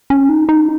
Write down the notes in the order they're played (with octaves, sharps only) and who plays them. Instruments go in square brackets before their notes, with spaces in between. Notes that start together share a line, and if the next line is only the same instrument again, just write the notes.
[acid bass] C#4
D#4
D#4